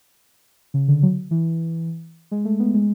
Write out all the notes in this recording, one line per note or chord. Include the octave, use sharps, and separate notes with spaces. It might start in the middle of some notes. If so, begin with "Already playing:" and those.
C#3
D3
F#3
E3
G#3
A3
B3
G#3